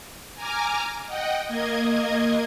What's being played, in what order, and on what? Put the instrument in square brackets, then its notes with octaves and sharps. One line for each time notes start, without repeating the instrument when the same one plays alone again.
[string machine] G#5 A#5 D6 F6
D#5 F#5 G5
A#3 D#5 G#6